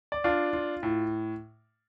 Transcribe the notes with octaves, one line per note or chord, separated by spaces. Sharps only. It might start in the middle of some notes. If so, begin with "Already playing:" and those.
D5
D4 F4 F5
F4
A2